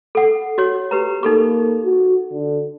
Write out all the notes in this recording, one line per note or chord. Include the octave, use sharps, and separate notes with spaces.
A4 F#5
F#4 C#5
G4 B4 A#5
A#3 D#4 A4 C#6
F#4
D3